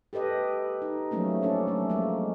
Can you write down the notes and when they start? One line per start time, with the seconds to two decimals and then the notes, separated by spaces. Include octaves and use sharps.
0.13 G4 A4 B4 D#5
0.82 D#4
1.11 F3 F#3 A3 A#3 C#4
1.42 C#4 D4 A4
1.67 F3 F#3 A3
1.90 G#3 A#3